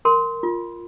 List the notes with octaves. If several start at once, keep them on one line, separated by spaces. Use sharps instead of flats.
A#4 C6
F4